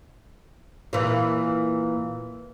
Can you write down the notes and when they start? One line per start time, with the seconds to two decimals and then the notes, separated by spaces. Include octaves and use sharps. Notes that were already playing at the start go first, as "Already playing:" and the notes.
0.93 A#2 E3